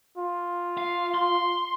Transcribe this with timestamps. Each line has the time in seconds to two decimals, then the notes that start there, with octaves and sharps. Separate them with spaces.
0.17 F4
0.78 F5
1.15 C6